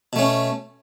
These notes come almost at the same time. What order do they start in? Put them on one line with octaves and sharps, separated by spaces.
B2 A3 C#4